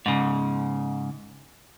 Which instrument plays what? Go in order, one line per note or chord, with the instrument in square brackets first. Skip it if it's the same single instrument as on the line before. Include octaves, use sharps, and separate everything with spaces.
[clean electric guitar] G#2 C#3